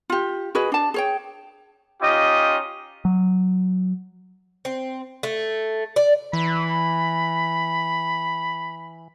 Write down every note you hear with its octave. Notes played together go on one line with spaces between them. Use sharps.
F4 G4
F#4 G#4 B4 D#5
D4 A5
G#4 C#5 G5
C#4 D#4 F4 G4 D#5
F#3
C4
A3
D5
E3 B5